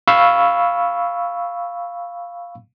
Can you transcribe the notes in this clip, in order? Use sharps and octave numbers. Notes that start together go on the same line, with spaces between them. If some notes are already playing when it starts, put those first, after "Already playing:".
F5 B5 C#6 E6